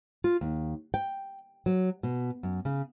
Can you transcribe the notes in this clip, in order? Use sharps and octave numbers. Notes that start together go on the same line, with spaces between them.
F4
D#2
G5
F#3
B2
F#2
C#3